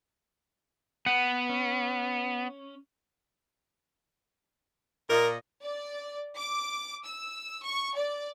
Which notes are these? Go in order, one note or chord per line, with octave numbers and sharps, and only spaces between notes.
B3 F#5
C#4
A#2 A#4 D#5
D5
D6
E6
C#6
D5